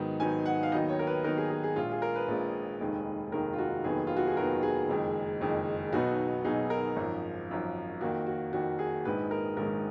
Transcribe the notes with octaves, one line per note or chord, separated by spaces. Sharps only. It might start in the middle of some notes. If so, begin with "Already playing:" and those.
Already playing: G#2 D#3 F#3 B3 D#4
G#2 D#3 F#3 B3 D#4 G#5
F#5
F5
D#2 D#3 F#3 B3 D#4 D#5
C#5
A#4
B4
D#2 D#3 F#3 B3 D#4 A#4
G#4
G#4
G#4
A#1 A#2 G#3 F4
G#4
A#4
B4
A#1 A#2 G#3
F1 D#2 D#3 G#3
F1 D#2 D#3 G#3 A#4
F4
F#4
F1 D#2 D#3 F#3 B3 G#4
F4
F#4
G#4
F1 D#2 D#3 F#3 B3 A#4
G#4
F#1 F2 D#3 G#3
F#1 F2 D#3 G#3
B1 B2 F#3 B3 D#4 F#4
B1 B2 F#3 B3 D#4 G#4
A#4
G#1 F#2 F3
G#1 F#2 F3
F2 D#3 A#3 F#4
F#4
F2 D#3 A#3 F#4
G#4
A#1 G#2 D#3 G#3 B4
A#4
A#1 G#2 D#3 G#3 A#4